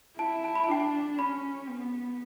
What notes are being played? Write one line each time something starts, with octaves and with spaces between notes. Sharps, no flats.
E4 A5
A5
B5
A5
D4 G5
A5
C#4 B5
B3